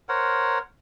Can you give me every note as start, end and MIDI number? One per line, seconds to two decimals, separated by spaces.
0.09 0.59 70
0.09 0.59 72
0.09 0.59 73
0.09 0.59 78